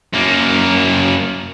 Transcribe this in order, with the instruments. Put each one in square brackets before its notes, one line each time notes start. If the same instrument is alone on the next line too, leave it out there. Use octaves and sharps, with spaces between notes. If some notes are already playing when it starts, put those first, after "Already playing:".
[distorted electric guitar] F#2 A#3